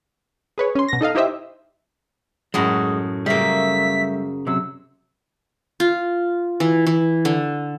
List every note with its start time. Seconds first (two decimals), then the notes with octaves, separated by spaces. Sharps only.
0.58 G#4 B4 C#5
0.75 C#4 C6
0.89 B2 A#6
1.01 D#4 A4 D#5 F5
1.15 D#4 E4 G4 C5 D#5 E5
2.54 F#2 A2 G#3 F#4 D#6
3.26 C#3 G3 A3 A#3 E5 B6
4.47 C3 F#3 E6
5.80 F4
6.60 E3
6.87 E3
7.25 D3